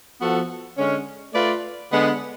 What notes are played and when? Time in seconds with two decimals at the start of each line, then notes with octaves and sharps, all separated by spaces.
0.20 F3 B3 F#4 A4
0.77 D3 G#3 C#4
1.33 A3 F4 B4 D5
1.90 D3 G#3 B3